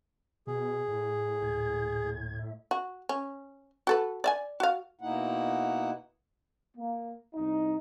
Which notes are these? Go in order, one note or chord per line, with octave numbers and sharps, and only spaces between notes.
B2 G#4
A2
D2 A#2 G#6
E5
F#4
C#4
F#4 A4 B4
D5 E5 G#5
F#4 F5
B2 A#3 D#4 E4 F#5
A#3
C2 D#4